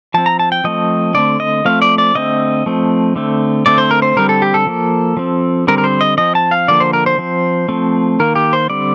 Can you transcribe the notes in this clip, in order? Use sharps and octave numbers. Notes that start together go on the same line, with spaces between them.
F3 C4 A5
A#5
A5
G5
F3 A3 C4 D#5
D3 A3 C4 D5
D#5
F3 A3 C4 F5
D5
D5
D3 A3 C4 D#5
F3 A3 C4
D3 A3 C4
D3 A3 C4 D5
C5
A#4
C5
D3 G3 C4 A#4
A4
G4
A4
F3 A#3
F3 C4
D3 G3 C4 A#4
A#4
C5
D#5
F3 C4 D#5
A5
F5
D3 F3 A#3 D5
C5
A#4
C5
F3 C4
F3 A3 C4
D#3 A#3 A#4
G4
C5
D3 G3 C4 D5